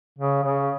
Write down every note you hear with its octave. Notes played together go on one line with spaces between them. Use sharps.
C#3
C#3